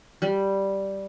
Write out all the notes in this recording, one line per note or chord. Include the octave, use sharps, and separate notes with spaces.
G3